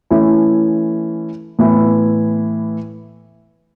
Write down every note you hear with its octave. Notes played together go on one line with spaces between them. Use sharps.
E3 A3 C#4 E4
A2 E3 B3 E4